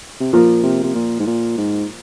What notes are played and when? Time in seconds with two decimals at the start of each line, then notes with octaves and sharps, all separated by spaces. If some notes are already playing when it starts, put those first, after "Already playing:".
0.20 C3
0.33 A#2 F3 A#3 F4 A#4
0.63 C3
0.84 C3
0.95 A#2
1.19 G#2
1.27 A#2
1.58 G#2